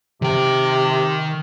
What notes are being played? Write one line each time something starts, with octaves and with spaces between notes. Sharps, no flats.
C3 D#3 G5